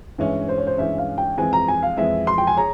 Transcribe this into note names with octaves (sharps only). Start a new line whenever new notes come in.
G2 E3 G#3 C#4 E5
C5
C#5
C5
G2 E3 G#3 C#4 E5
F5
G5
F2 E3 G#3 C4 G#5
A#5
G#5
F5
F2 E3 G#3 C4 E5
C6
G5
G#5
G#4 C#5 A#5